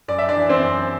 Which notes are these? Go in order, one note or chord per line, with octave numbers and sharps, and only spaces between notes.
F#2 D5
E5
D4 D5
E3
C4 C5
F#2